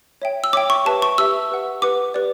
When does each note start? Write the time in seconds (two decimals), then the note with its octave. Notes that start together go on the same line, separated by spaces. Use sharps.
0.22 C#5 E5 G5
0.44 E6
0.53 C#5 D6
0.56 E5 G5
0.70 C#6
0.85 G4 B4 E5 A5
1.02 C#6
1.18 G4 B4 E5 E6
1.50 G4 B4 F#5
1.82 G4 B4 F#5 D6
2.14 G4 B4 D5